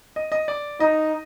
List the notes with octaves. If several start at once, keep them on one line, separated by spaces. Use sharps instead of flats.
D#5
D#5
D5
D#4 D#5